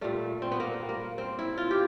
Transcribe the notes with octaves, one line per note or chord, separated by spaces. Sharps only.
A#2 G3 A3
C4
B3
A#3
A#3
C4
E4
F4
G4